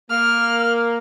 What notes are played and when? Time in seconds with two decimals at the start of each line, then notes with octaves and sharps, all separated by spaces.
0.10 A#3 F6